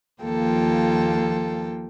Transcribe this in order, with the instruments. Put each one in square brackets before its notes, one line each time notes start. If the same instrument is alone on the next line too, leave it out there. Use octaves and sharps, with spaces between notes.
[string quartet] D#2 F3 A#3 F4 A4 G5